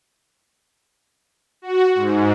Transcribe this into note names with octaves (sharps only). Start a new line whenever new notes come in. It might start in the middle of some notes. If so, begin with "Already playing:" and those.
F#4
G#2